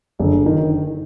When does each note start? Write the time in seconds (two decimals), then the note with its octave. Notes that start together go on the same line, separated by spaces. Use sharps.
0.20 F#1 D3
0.46 D#3